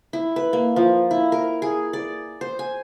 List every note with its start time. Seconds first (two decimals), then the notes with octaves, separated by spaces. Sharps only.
0.13 E4
0.36 B4
0.53 A#3
0.76 F3
1.11 E4
1.32 A#4
1.62 G#4
1.93 D5
2.41 C5
2.59 G#5